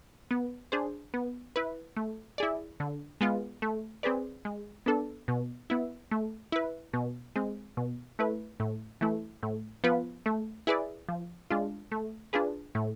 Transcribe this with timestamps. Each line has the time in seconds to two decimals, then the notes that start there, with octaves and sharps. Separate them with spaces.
0.31 B3
0.72 D4 G#4 C5
1.14 B3
1.56 E4 B4
1.97 A3
2.38 E4 G#4 D5
2.80 D3
3.21 G#3 B3 F4
3.62 A3
4.03 C4 G#4 B4 D5
4.45 G#3
4.86 B3 D4 A4
5.28 B2
5.70 B3 E4
6.11 A3
6.52 E4 B4
6.93 B2
7.36 G#3 C4
7.77 B2
8.19 A3 E4 B4
8.60 A2
9.01 E3 A3 E4
9.43 A2
9.84 F3 B3 F4 B4
10.26 A3
10.67 E4 G#4 B4 D5
11.09 F3
11.50 G#3 D4 F4
11.92 A3
12.33 D4 F4 G#4 B4
12.75 A2